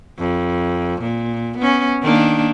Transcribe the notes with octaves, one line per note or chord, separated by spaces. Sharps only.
F2
A#2
B3 C#4
D#3 A#3 D4